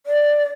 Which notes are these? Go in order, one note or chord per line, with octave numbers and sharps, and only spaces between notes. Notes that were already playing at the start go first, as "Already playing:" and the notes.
D5